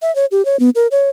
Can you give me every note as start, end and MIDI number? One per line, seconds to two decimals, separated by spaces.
0.02 0.14 76
0.16 0.26 73
0.31 0.45 67
0.45 0.59 73
0.60 0.70 59
0.75 0.87 70
0.91 1.10 73